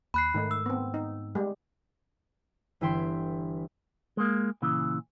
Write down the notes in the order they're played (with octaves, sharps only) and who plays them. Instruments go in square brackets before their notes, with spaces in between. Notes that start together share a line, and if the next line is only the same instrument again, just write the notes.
[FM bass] D#2 [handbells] B5 F#6 C7
[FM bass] G#2 [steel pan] D#3 A3 D#4
[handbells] E6
[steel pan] B3 C4
D#4
G3 G#3
[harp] G1 E3 E4 G5 C6 B6
[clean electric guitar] G#3 A#3
A#2 C#3 E3